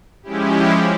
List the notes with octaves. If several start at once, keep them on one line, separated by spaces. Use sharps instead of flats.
F3 G#3 C#4 E4 G4